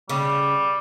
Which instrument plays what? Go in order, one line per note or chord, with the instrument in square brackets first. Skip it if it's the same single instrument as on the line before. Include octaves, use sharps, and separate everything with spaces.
[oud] C#3 [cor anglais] G3